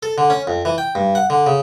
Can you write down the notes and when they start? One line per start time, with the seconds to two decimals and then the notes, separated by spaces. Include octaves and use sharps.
0.03 A4
0.18 D3
0.30 C#4
0.47 F2
0.65 E3
0.78 G5
0.95 G2
1.15 F#5
1.30 D3
1.46 C#3